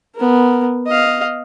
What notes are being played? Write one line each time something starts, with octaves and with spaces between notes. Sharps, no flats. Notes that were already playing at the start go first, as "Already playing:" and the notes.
B3 A#4
D#5 F5